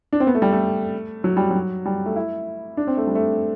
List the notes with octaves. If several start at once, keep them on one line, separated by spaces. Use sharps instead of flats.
D4
C4
B3
A3
G3
A3
F#3
G3
F#3
G3
A3
E4
D4
C4
A3
G3
A3